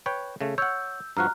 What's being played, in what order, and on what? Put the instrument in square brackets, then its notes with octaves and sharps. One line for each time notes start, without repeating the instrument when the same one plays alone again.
[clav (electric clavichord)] B4 C#5 G5
C#3 A3
[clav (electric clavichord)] C#5 F#5 [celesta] E6 G6
[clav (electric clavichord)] G2 F3 F#4 [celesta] A#5 F6 F#6